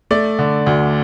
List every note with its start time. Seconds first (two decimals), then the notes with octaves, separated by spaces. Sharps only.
0.11 A3 D5
0.39 D3
0.67 D2